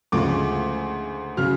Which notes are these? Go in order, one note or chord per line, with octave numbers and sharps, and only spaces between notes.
D2 C#3 F3 G#3 D6
C#3 F#3 F6